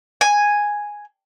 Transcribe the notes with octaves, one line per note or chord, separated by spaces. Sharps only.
G#5